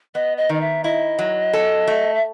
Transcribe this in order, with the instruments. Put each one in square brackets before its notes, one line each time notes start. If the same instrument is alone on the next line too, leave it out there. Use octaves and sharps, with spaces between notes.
[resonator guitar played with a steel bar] B3 [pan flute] D#5
[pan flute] D#5
[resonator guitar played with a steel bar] D#3 [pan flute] D#5
[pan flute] E5
[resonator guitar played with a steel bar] E4 [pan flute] D#5
[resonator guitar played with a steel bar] F#3
A4
A3
[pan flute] E5